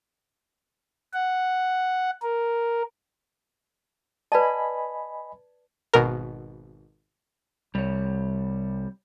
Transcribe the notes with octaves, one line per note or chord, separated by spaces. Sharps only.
F#5
A#4
B4 D5 D#5 G#5 A5 B5
G#1 B2 A#4
C2 G3 C#5